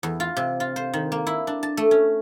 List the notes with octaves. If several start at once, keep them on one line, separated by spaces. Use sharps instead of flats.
E2
F4
C3
F4
C5
D#3
A#3
E4
D4
A5
A3
C#4